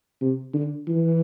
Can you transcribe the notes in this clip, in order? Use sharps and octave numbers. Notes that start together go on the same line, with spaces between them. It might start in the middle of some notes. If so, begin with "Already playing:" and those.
C3
D3
E3